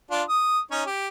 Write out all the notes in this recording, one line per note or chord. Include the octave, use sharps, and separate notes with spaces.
D4 F4
D#6
C#4 D#4 C#5
G4